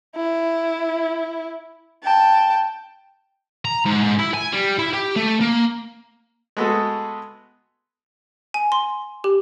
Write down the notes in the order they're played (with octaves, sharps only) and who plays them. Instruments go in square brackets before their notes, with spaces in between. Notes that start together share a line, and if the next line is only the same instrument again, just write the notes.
[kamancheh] E4
G5 A5
[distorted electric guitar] A#5
G#2
G#2
E4
G#5
G3
E4
G4
A3
A#3
[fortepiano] G#3 A3 B3 F#4 G#4 A4
[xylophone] G#5
C6
G4